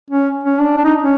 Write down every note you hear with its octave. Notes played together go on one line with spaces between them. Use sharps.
C#4
C#4
D4
D4
D#4
C#4